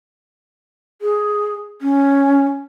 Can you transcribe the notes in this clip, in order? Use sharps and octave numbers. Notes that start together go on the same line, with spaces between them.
G#4
C#4